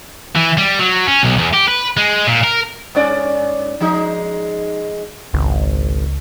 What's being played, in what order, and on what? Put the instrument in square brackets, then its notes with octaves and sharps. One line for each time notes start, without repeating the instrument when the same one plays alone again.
[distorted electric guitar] E3
G3
F#3
C#4
B1
E2
G4
B4
G#3
A#2
A#4
[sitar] G2 C#4 D5
F3 G#3 D#4
[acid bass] G#1 [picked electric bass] C#2